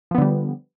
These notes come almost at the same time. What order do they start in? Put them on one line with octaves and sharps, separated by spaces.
F3 B3 D3 G3